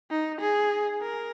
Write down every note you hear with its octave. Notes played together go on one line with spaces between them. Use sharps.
D#4
G#4
A#4